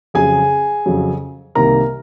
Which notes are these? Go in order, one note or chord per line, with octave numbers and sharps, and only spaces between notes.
F2 C#3 F#3 G#4 G#5
F2 C#3 F#3
C2 C3 D#3 A#3 A#4 A#5